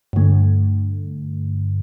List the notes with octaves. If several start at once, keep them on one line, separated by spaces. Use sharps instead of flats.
G2 D3 A3